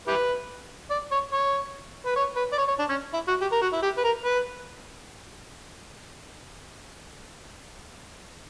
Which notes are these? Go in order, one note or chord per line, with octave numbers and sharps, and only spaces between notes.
E4 G4 B4
D5
C#5
C#5
B4
C#5
B4
D5
C#5
C#5
D4
C#4
E4
F#4
G4
A#4
F#4
E4
G4
B4
A#4
B4